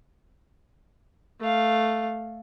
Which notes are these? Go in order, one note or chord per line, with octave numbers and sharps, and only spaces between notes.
A3 F5